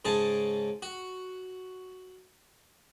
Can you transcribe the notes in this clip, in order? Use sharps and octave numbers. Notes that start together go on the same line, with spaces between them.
G#2 C#3 G#4 A5
F#4